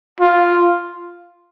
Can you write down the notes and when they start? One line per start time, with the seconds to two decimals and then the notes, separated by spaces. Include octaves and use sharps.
0.20 F4